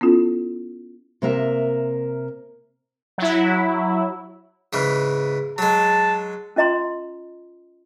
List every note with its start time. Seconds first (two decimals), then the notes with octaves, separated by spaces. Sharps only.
0.01 B3 C#4 E4 F4 A4
1.22 C3 A#3 A#4 E5
3.18 F#3 E4
4.73 G#2 C#3 E3
5.58 F#3 G#3 A5
6.56 C#4 F4 D#5 A#5 C6